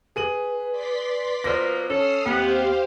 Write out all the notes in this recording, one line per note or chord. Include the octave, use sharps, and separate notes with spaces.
G#4 B4 D#7 F#7
D5 C6 B6
B2 F3 A#3 C5 A#6
C#4 A4 D#6 F6 C7
D#2 B3 C4 G4 C5 F5